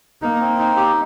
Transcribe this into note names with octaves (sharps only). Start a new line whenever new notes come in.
A#3 D#4
C4
D#4
G4